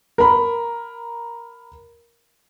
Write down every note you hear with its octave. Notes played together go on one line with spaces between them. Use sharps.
A#4 B5